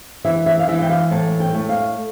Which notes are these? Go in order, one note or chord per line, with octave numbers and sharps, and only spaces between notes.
E3 E5
E5
F5
E3 E5
G5
F5
A2 A5
G5
A3
F5